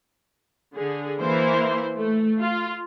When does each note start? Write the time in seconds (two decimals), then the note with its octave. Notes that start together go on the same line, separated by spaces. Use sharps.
0.75 D3 G#4
1.20 E3 A#3 E4 C5
1.96 A3
2.40 F4